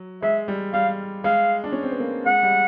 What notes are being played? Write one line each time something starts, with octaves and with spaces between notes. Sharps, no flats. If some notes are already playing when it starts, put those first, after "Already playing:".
Already playing: F#3
G#3 E5
G3
G3 F5
G#3 F5
D4
C#4
C4
B3
A#3
G#3 F#5
G3